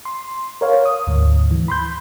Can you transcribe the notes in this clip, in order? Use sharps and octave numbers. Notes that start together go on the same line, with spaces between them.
C6
A#4 C#5 F5
D#6
D2 G#2
E3
B5 C6 G6